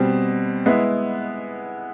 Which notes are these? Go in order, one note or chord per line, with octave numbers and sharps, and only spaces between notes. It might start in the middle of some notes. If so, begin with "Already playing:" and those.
Already playing: B2 G3 C4
G#3 B3 E4